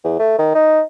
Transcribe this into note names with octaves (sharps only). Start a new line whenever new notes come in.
E2
A3
D#3
D#4